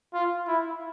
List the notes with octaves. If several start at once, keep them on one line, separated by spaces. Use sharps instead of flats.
F4
E4